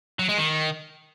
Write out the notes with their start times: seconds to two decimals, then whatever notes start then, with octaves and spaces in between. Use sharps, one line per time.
0.19 F#3
0.29 G#3
0.38 D#3